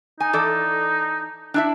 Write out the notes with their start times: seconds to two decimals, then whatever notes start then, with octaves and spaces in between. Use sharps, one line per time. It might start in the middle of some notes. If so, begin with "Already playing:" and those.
0.20 D#4 G#5
0.33 E3 A4 D5
1.54 D4 E4 E5